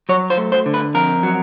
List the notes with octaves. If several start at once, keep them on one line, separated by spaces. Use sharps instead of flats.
F#3 C#5
C5
A3
C5
D3
B4
F2 A#4
F#3